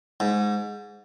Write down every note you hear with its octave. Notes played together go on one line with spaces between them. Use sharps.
G#2